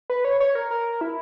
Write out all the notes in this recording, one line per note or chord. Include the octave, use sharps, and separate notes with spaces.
B4
C#5
C#5
A#4
A#4
E4